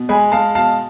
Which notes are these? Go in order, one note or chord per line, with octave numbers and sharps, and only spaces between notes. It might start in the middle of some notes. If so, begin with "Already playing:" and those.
Already playing: B2
G#3 G#5 B5
G#3 F5 A5
B2 F5 A5